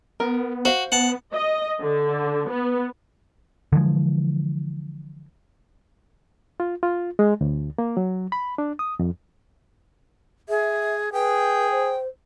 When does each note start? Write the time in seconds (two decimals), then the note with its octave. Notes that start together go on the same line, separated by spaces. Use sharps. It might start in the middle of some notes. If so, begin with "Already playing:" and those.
0.20 B3 A#4
0.65 F#4 C5 F5
0.92 B3 F#5 A5
1.34 D#5
1.81 D3
2.48 B3
3.73 D3 E3 F3 G#3
6.60 F4
6.83 F4
7.19 G#3
7.41 D2
7.78 A#3
7.97 F#3
8.32 B5
8.58 D4
8.79 D#6
8.99 F2
10.49 G#4 E5
11.13 G#4 B4 G5
11.71 C5